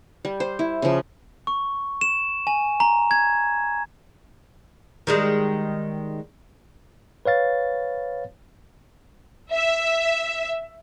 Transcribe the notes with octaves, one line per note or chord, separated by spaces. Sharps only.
G3
C5
E4
C#3 F3
C#6
E7
G#5
A#5
G#6
D#3 G3 G#3
B4 C#5 F5 A6
E5